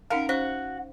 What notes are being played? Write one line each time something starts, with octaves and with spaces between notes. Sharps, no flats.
C#4 D#4 A#4 F5 F#5
C#4 F#4 C5